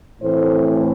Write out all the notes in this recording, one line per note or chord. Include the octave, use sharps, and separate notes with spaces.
A2 E3 A3 C4 C5